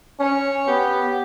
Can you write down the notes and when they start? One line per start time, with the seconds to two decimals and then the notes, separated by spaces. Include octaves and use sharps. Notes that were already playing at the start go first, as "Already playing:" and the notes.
0.20 C#4 C#5
0.67 B3 G4